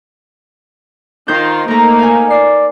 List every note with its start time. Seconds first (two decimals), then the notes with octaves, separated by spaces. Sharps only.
1.28 D#3 D#4 F4 C5 C6 G6
1.68 A3 A#3 D#4 A#4 A#5
1.99 F5 G#5
2.30 D5 C7